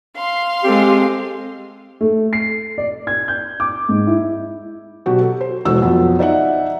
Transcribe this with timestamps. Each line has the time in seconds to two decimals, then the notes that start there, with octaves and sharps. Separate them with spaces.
0.16 F5 C6
0.64 G#3 C4 G4 A4
2.01 A3
2.33 C7
2.78 D5
3.07 G#6
3.28 G6
3.60 D6
3.89 G#2
4.07 E4
5.06 B2 F#3 F#4 G4
5.21 A4
5.41 C5
5.65 E1 E3 F#4 A4 E6
5.82 F2 F#3 B3
6.19 D#4 D5 E5 F#5